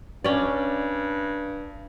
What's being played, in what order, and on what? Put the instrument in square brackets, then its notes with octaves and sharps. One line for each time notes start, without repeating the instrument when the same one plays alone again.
[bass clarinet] G2 [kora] C#4 D5